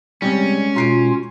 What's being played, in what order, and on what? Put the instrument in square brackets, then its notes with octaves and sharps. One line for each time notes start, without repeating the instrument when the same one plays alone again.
[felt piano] C3 G3 [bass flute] G#3 [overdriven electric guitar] C#4
[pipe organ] B2 F4 [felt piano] A#5 C7 D7